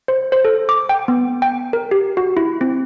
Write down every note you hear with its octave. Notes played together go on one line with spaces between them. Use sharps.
C5
C5
A4
D6
G5
B3
G5
A#4
G4
F#4
E4
C4